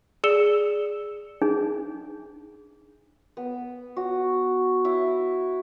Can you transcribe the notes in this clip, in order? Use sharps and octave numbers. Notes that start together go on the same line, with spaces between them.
G#4 D5 E6 C#7 E7 G7
D4 D#4 G#4
B3
F#4
E4